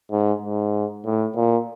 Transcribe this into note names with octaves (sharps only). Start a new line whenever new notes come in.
G#2
G#2
A2
A#2